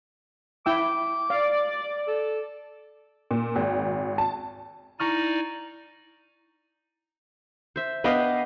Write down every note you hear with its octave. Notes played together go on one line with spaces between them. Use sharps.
E4 G5 D6 E6
D5 F5
A4
A#2
G#1
A5
D#4 E4 D5 G#5 A#5 C#6 F6
C5 E5
B3 D4 B4 D#5 F5 G5